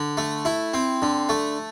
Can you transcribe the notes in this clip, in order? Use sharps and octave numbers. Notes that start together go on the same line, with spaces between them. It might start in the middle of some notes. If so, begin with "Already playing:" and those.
Already playing: D3
A3
E4
C4
D3
A3